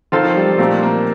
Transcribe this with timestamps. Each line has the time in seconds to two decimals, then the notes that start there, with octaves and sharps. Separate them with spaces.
0.12 D#3 C4 F4 A4 C5 F5
0.24 F3
0.36 G3
0.47 G3
0.58 A#2 A3 A#3 C4
0.83 A#3